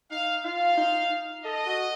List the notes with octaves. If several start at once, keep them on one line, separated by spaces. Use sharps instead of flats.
D#4 F5
F4 F5
D#4
A4 D#5
F#4